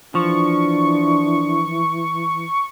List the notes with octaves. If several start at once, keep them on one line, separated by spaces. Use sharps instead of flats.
E3 F3 D4 C#6